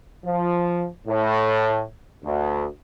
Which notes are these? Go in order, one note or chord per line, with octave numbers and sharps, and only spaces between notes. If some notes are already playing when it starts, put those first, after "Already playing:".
F3
A2
D2